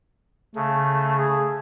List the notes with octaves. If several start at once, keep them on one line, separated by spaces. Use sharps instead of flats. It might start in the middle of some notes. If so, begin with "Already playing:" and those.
C#3 A3
G#4